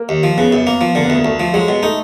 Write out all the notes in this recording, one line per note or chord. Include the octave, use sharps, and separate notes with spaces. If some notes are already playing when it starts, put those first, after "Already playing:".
Already playing: A#3
D#2
F3
C#3 B3
F#2
A#3
F3
D3 A#3
D2 B3
A#3
D2 A3
F3
F#3 G#3
B2
A3 D#4